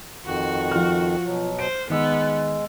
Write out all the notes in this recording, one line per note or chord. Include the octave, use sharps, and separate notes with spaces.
F2 D#3 F#4
F3 F6
B2 F#3
C5 D7
D#3 G#3 B3 E6